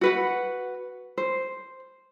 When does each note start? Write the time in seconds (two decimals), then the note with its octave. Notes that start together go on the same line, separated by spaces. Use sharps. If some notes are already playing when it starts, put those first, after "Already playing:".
0.01 F#4 B4 F#5
1.18 C5